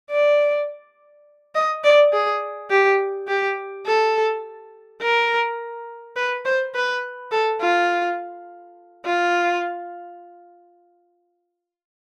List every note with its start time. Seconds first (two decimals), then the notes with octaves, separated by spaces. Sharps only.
0.11 D5
1.55 D#5
1.84 D5
2.13 G#4
2.70 G4
3.28 G4
3.86 A4
5.02 A#4
6.16 B4
6.45 C5
6.74 B4
7.32 A4
7.61 F4
9.05 F4